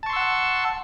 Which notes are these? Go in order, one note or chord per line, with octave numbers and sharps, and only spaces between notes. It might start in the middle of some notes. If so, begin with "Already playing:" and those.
F#5 A5 C6 C#6 E6